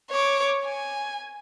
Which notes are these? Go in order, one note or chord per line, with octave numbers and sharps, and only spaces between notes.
C#5 D6
G#5